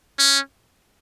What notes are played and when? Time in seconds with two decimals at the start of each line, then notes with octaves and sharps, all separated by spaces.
0.19 C#4